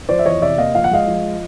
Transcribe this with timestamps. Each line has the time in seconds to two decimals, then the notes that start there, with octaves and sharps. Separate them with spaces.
0.09 F3 C5 D5
0.19 E5
0.25 E2 C#5 D#5
0.42 C3 D5 E5
0.58 A#3 D#5 F5
0.74 F3 F5
0.84 F#5
0.91 G#3 D#5 F5
1.08 F3